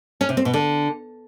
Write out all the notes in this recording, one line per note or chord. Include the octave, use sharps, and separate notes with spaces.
C#4
C3
C4
B2
D3